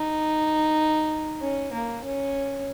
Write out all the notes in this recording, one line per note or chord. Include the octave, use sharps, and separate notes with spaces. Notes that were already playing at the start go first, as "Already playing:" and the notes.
Already playing: D#4
C#4
A#3
C#4